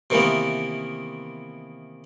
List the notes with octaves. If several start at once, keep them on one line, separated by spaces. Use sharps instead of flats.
C3 D#3 E3 A#3 B3